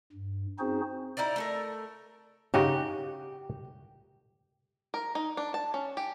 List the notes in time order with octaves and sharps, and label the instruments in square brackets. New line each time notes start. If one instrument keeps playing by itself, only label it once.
[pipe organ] G2
C4 C#4 D#4 F#4 G#4 C5
[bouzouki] D#4 E4 A#4 D5
A3 A4 A#4
[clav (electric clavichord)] C#3 D#4 F#4 [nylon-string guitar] G4
[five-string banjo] A#4
D#4
D4
A5
C#4
G4